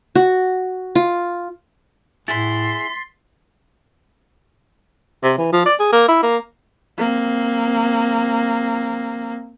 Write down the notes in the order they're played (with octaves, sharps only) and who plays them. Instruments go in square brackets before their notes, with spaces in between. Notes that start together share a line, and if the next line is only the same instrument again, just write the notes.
[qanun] F#4
F4
[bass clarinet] A2 [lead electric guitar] E4 G#4 [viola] C6 [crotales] A6 B6
[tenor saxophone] C3
E3
F3
D5
G#4
A#3
E4
A#3
[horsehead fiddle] A#3 C4